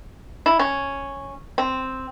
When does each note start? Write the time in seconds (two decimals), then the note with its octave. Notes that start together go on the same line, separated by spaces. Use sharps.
0.46 E4
0.59 C#4
1.58 C4